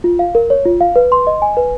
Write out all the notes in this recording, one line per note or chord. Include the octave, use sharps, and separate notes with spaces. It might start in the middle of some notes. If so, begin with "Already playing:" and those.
F4
F5
A#4
C#5
F4
F5
B4
C6
D#5
G#5
B4